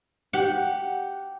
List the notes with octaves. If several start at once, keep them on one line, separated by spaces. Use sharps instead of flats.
G4 F#5